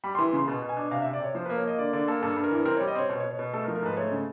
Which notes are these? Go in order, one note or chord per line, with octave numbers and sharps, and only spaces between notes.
G3 B5
C6
E3
C#3 C6
B2
B2
G#5
D4
C3 F5
E5
C3
D5
C3 C#5
F3 C5
B4
A#3
C#5
A#3 D#5
D3 D5
D3 D5
A#3 A4
G2 A4
G2
A#4
E3
C4 A#4
C#5
G3
D#5
C4 C#5
B2 C#5
C#5
B2
C#5
B2
A3 A4
A#4
F3
A#4
G#2 B4
A3 C#5
C#3